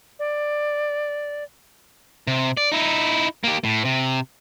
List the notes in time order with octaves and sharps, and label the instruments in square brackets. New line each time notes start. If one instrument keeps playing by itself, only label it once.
[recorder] D5
[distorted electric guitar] C3
D5
D#4 E4
A#3 G4
A2
C3